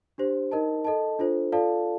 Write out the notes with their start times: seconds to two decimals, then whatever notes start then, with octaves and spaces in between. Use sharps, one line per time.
0.18 D4 G4 C5
0.51 D#4 A#4 D#5 A5
0.85 A4 D#5 A5
1.19 D4 F4 A4 C5
1.52 F4 A4 D5 F5 A5